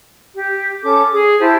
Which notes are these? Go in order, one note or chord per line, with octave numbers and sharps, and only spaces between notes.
G4
C#4 A4 D6
G#4 D#6
E4 G4 C5 A5